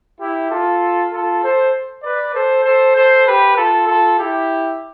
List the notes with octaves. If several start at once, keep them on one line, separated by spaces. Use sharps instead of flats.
E4 G4
F4 A4
F4 A4
A4 C5
B4 D5
A4 C5
A4 C5
A4 C5
G4 B4
F4 A4
F4 A4
E4 G4